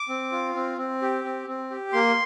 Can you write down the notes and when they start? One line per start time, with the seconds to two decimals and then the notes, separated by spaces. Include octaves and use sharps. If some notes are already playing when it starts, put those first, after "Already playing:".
Already playing: D6
0.09 C4
0.32 F4
0.55 C4
0.78 C4
1.02 G4
1.24 C4
1.47 C4
1.70 G4
1.93 A#3 C6